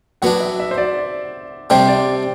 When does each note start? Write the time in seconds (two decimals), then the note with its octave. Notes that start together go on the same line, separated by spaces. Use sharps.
0.22 F#3 B3 D4 F#5
0.40 E5
0.60 E5
0.71 C5
0.78 D5
1.70 C3 G3 D4 C5
1.88 D5